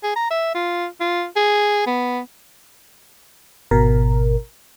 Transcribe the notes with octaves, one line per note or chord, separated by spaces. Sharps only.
G#4
A#5
E5
F4
F4
G#4
B3
G#1 B2 A#4